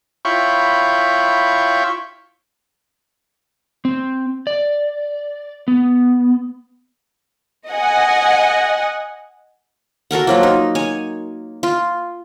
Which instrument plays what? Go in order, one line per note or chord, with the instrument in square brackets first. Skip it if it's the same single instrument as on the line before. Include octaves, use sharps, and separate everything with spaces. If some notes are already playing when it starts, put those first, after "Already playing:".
[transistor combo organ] E4 F4 C#5 G5 B5 C#6
[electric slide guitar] C4
D5
B3
[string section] D#5 F#5 G#5
[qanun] F#4 A4 A#4 F#5
F3 F#3 A#3
D#4
C#5 G#5
F4